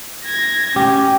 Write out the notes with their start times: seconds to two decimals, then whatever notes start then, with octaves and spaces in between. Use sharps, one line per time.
0.25 G#6 A#6
0.76 C#4 G4